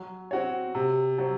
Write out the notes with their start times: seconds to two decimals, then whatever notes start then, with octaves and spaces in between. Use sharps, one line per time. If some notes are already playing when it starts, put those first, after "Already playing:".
Already playing: F#3
0.31 C4 F#4 C#5
0.75 C3
1.18 F#3 C4